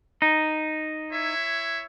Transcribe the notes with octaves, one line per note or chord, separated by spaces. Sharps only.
D#4
E4 C#5 E5